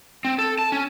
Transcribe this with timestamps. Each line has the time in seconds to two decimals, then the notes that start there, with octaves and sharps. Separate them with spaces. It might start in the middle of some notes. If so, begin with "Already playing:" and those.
0.25 C4
0.38 A4
0.59 A5
0.72 C#4